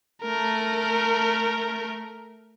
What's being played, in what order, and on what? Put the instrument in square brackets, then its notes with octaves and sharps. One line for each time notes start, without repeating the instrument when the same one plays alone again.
[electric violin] A3 A#4